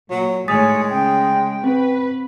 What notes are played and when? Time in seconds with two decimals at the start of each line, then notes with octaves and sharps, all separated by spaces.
0.10 A#2 F#3
0.48 A2 D#3 G#3 C#5 G#5 D#6 A6 B6
0.90 C#3 G5
1.64 C4 B4